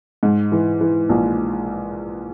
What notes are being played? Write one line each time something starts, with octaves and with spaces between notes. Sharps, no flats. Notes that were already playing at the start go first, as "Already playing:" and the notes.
G#2
E3
E3
A#1